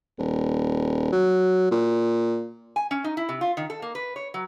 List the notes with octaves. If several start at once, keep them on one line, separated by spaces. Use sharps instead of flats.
D#1
F#3
A#2
G#5
C#4
D#4
E4
C3
F4
D#3
A4
A#3
B4
C#5
F#3